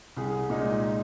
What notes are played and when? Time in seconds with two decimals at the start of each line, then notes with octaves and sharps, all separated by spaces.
0.16 C2 G#4
0.50 A#2 G#3 D#4